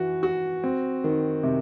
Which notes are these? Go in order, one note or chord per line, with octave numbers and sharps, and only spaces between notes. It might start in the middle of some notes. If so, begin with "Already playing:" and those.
Already playing: E3 F#4
F#4
C4
D#3
C3